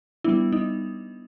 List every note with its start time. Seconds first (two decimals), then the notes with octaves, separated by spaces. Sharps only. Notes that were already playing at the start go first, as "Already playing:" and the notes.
0.24 G3 B3 D4 E4
0.52 D#4